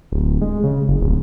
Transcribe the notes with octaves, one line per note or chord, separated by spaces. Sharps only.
D1
G#3
C#3
F#1
D1